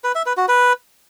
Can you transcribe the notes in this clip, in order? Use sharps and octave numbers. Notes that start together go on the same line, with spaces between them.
B4
E5
B4
F#4
B4